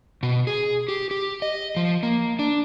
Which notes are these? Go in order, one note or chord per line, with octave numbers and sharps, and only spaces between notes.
B2
G#4
G4
G4
D#5
F3
A#3
D4